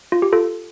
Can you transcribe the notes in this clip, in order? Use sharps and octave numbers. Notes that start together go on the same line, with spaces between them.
F4
G4
F4 A4